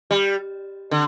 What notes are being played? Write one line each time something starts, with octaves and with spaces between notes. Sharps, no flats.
G3
D3